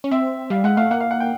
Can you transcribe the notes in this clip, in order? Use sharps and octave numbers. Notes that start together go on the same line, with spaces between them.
C#4
C4 E5
G3 F5
G#3 F#5
A3 F5
A#3 F#5
F5
F#5
G5